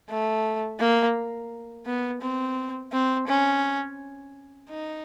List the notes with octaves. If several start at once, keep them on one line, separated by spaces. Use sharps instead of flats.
A3
A#3
B3
C4
C4
C#4
D#4